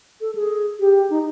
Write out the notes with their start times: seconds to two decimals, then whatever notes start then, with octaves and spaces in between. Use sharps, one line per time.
0.21 A4
0.35 G#4
0.80 G4
1.10 D#4